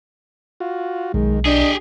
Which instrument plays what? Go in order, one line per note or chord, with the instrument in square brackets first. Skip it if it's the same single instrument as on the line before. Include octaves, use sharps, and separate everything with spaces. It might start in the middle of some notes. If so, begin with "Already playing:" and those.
[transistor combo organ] F4 F#4
[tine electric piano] B1 [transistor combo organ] D#3 [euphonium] G#3
[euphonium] D4 [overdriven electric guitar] G4 G#4 [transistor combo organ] D#5